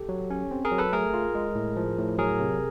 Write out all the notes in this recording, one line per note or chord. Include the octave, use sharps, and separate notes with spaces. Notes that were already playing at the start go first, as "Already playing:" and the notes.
Already playing: G4 A4
F#3
C#4
C4
G#4 A#4
F#3
A4 B4
A3 G#4 A#4
F4
G#3
A2
F3
A2
F#3 G#4 A#4
C3